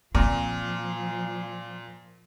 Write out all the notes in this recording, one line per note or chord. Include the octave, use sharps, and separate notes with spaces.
A#2 F3 C4